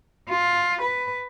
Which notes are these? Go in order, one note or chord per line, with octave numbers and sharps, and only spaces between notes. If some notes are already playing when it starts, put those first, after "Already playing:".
F4
B4